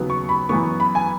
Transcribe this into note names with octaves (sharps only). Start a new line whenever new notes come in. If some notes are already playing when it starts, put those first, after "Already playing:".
Already playing: D#2 C#3 F#3 B3
C#6
B5
F#2 E3 B3 C#6
B5
G#5